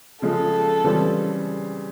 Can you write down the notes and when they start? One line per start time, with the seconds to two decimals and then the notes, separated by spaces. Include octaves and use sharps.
0.22 C#3 F3 G#3 A4
0.84 C#3 E3 G3 C4